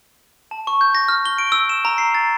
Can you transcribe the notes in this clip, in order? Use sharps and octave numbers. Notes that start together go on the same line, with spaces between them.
A5
C#6
G6
A#6
F6
G7
D7
E6
E7
A#5
C7
A6